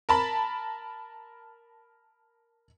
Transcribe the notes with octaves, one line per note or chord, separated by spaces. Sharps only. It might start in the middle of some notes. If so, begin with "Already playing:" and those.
A#4 A5 B5